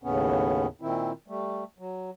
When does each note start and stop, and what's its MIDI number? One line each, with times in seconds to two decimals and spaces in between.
0.03 0.67 39
0.03 0.67 45
0.03 0.67 49
0.03 0.67 59
0.03 0.67 61
0.81 1.12 46
0.81 1.12 51
0.81 1.12 60
0.81 1.12 64
1.28 1.64 55
1.28 1.64 57
1.79 2.11 54